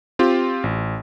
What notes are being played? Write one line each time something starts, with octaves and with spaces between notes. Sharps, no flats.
C4 F4 G4
A1